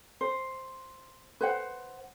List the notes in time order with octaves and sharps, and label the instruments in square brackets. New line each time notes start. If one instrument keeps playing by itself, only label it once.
[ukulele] C5
B4 C5 F#5